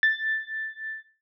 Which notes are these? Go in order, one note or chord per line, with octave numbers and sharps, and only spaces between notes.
A6